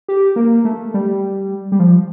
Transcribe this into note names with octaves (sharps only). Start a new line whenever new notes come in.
G4
A#3
A3
G3
G3
F3